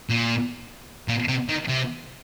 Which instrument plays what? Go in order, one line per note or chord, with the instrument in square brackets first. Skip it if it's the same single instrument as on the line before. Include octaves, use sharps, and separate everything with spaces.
[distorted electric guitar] A#2
A#2
C3
D#3
C3